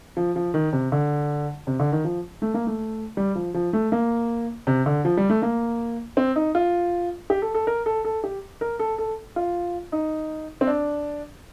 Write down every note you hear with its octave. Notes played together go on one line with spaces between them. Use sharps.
F3
F3
D#3
C3
D3
C3
D3
D#3
F3
A3
A#3
A3
G3
F3
F3
A3
A#3
C3
D3
F3
G3
A3
A#3
C4
D#4
F4
G4
A4
A4
A#4
A4
A4
G4
A#4
A4
A4
F4
D#4
C4
D4